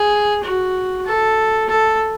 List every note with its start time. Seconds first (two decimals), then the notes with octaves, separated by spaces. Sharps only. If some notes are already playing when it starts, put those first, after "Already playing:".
Already playing: G#4
0.43 F#4
1.06 A4
1.69 A4